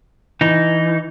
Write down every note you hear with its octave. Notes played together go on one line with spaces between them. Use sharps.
E3 D#4